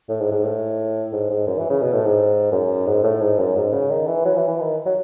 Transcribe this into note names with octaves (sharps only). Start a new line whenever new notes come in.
A2
G#2
G#2
A2
G#2
G#2
F#2
E3
C#3
B2
A2
G#2
F#2
G#2
A2
G#2
F#2
G#2
C#3
D#3
E3
F#3
E3
E3
D#3
F#3